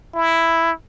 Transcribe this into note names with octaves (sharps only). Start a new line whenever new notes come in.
E4